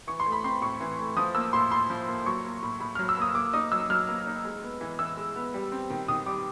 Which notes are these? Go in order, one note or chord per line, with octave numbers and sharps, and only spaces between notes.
E3 C#6
C6
A3
B5
C4 C6
A2 C#6
E3
A3
F3 D#6
A#3 E6
A2 C6
A2 C6
F3
A#3
F#3 C#6
A#3
A2
A2
F#3 F6
E6
A#3 D#6
A#3 D6
D#4 D#6
F#3 E6
F#3 F6
A#3
D#4
G#3
B3
E3
E3 E6
G#3
B3
G3
C4
D#3
D#3 D#6
G3 D6